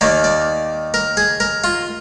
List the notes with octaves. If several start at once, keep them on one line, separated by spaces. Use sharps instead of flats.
D#2 D#3 A#3 D5
D5
A#4
G#4
A#4
F4